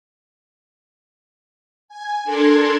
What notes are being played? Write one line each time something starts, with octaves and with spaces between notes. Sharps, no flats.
G#5
D4 A4 A#4 C6 G#6